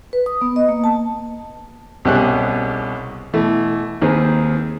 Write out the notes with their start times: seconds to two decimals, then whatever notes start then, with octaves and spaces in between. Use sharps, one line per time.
0.13 B4
0.26 D#6
0.41 B3
0.56 D#5
0.69 A#3
0.84 A5
2.05 C2 B2 C#4 G4 G#4 F#6
3.33 B2 E3 A3
4.02 D#2 D#3 C4 G#4 B4